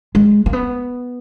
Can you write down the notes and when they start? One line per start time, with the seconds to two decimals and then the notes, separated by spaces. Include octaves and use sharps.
0.15 G#3
0.46 A#3
0.53 B3